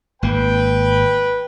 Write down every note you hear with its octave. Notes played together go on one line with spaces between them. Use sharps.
G#1 A#3 B4 G5